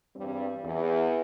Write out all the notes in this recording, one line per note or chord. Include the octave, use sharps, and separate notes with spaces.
E2 G2 G3 C4
E2